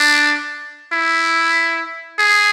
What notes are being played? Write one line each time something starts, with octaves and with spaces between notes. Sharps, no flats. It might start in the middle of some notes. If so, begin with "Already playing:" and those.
Already playing: D4
E4
G#4